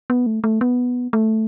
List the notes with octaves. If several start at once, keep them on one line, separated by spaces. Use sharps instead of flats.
B3
A3
A3
B3
A3